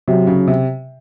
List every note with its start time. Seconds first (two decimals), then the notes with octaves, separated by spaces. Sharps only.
0.08 C3 F#3
0.27 C#3
0.47 C3